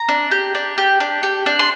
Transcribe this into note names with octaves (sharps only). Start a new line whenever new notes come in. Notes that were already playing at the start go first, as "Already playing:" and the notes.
Already playing: A#5
D4
G4
D4
G4
D4
G4
D4
C6